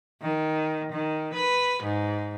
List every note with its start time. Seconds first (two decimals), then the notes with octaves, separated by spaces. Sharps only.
0.22 D#3
0.92 D#3
1.34 B4
1.83 G#2